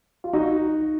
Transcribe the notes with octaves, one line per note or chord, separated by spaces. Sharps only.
F4
D#4 F#4